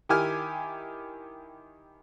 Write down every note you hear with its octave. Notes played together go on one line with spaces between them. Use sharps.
D#3 E4 G4 G#5 F6